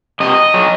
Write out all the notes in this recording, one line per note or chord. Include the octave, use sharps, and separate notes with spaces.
C3 D#5
F#3